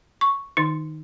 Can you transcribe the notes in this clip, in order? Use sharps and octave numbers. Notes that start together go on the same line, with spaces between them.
C#6
D#3 D#4